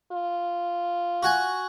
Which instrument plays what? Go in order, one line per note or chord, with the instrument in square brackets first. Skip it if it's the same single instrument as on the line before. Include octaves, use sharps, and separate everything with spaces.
[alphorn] F4
[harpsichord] F#4 F#5 G#5